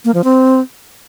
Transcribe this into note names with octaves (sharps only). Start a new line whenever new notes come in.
A#3
F3
C4